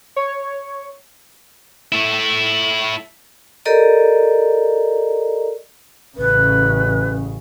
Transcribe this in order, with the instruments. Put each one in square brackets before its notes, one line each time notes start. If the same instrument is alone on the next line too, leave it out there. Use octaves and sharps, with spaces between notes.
[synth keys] C#5
[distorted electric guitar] A3 E4
[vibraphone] G4 A4 A#4 D5 D#5 A#5
[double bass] A1 C#3 [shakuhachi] B4